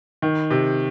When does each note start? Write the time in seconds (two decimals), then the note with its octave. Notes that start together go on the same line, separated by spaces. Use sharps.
0.22 D#3
0.51 C3